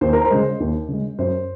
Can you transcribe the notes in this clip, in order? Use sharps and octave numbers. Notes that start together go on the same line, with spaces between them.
D#2 C5
A#4
C5
C#3 G#3
D#2
C#3 G#3
F#2 C5